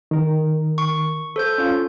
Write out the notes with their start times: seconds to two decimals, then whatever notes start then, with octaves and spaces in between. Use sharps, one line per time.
0.11 D#3 A#4
0.78 C#6
1.36 A4 C5 G6
1.58 C#4 F4